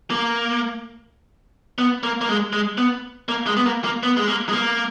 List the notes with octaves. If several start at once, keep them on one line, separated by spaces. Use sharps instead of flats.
A#3
B3
A#3
A#3
G#3
G#3
B3
A#3
G#3
B3
A#3
A#3
B3
G#3
A#3
G#3
A#3